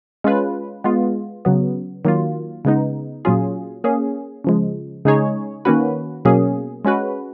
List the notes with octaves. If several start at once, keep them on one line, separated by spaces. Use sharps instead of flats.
G#3 C#4 F4 B4
G#3 B3 F4
C#3 F#3 B3
D#3 F#3 A#3 F4
C#3 G#3 B3 D#4
A#2 F#3 C#4 F4 G#4
A#3 C#4 G#4
C#3 F3 G#3
C#3 G#3 D#4 G#4 C#5
D#3 A#3 C#4 F#4 B4
B2 F#3 A#3 C#4 G#4
G#3 C#4 F#4 B4